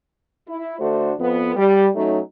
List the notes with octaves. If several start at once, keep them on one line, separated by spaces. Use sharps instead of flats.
E4
D3 A3 D4 F#4 C5
F2 B3
G3
F#3 A3 C#4 D#4